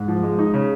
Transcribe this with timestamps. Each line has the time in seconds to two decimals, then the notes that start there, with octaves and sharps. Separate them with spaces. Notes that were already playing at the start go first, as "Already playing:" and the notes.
Already playing: G#2
0.08 F3
0.23 G#3
0.39 D#4
0.54 C#3